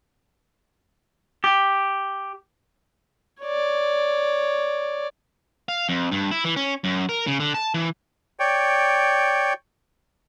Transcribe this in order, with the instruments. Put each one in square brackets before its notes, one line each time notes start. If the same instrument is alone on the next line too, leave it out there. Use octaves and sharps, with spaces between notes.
[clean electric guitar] G4
[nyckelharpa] C#5 D5
[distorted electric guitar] F5
F2
G2
E4
E3
C#4
F#2
A#4
C#3
D3
A5
E3
[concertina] C#5 D5 G5